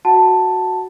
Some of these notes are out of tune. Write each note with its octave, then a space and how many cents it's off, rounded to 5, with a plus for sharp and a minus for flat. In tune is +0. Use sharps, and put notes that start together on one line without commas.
F#4 +0 F#5 +15 A5 +5